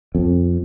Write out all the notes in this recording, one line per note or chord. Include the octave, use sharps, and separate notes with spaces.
F2